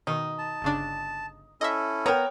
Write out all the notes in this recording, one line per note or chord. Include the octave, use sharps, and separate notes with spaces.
B2 D#3 D#4
A5
G1 C#3 D4
C#4 E4 A4 D#5 E5
B3 A#4 C#5 G5 A#5